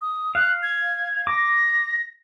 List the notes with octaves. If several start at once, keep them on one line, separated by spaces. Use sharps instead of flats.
D#6
F5 F#6
G#6
D6 A#6